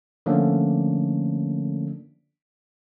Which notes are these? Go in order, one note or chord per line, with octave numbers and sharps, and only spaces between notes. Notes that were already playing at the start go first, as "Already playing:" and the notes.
D3 F3 A3 A#3 C#4 D4